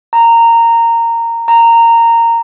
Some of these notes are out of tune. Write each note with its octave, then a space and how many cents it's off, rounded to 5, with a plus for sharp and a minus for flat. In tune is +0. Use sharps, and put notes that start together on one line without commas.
A#5 -15
A#5 -15